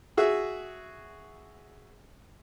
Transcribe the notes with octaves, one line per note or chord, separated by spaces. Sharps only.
F#4 G#4 E5